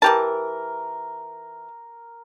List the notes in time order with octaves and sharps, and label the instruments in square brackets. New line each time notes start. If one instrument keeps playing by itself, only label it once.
[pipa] E3 G4 A5 [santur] A#4